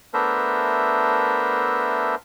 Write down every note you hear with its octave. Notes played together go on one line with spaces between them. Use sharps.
A3 B3 D4 A#4 C5 E5